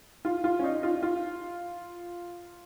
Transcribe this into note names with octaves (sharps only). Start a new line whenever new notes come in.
F4
F4
C#4
D#4
F4
F4